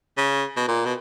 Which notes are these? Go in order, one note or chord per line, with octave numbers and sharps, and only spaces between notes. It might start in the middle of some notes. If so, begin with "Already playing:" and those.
C#3
B2
A#2
B2